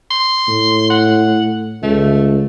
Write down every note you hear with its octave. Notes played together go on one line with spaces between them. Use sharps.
C6
A2
F#5
C#2 A3